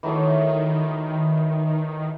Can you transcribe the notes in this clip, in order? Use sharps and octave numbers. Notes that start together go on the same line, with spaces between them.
D#3 E3 F#3 A3